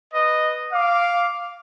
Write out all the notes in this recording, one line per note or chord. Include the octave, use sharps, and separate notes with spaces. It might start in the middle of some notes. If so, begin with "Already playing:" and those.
B4 D#5
F5 D6